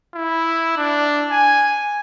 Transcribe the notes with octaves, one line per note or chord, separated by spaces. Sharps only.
E4
D4
G#5